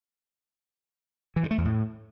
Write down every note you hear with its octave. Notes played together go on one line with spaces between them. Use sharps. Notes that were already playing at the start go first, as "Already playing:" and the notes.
E3
G2
A3
E2
A2